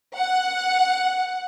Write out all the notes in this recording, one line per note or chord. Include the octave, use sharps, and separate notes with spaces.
F#5